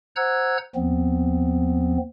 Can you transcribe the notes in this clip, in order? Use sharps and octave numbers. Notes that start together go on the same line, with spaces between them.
C5 F#5 A#5 E6 F#6 G#6
D#2 F3 B3 C4